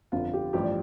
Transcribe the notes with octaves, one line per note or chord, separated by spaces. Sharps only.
G1 F2 D3 F4
G4
A1 G2 F3 G4
D5